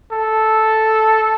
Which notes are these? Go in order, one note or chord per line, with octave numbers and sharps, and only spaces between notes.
A4